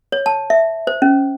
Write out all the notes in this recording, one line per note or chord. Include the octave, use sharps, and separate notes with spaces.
C#5
A5
E5
C5
C#4